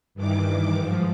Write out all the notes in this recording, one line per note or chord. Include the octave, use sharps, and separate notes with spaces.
G2 D#3 E3 D6
G#2 F3